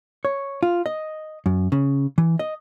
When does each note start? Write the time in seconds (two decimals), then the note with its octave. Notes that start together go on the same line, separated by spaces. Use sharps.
0.25 C#5
0.63 F4
0.86 D#5
1.46 F#2
1.72 C#3
2.18 E3
2.39 D#5